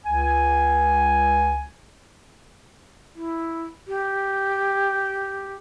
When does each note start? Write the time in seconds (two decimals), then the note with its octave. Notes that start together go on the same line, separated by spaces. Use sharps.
0.05 C#2 G#5
3.15 E4
3.87 G4